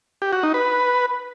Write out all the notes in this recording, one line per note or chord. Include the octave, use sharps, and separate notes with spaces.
G4
F#4
D#4
B4